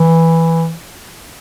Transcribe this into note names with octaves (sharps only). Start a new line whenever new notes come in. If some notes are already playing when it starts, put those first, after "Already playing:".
Already playing: E3